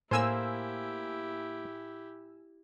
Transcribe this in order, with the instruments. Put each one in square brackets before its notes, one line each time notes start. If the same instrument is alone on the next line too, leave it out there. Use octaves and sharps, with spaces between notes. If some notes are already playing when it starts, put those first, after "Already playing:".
[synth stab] A2 G#5 E6 [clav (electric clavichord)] A#3 C5 [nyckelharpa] E4 G4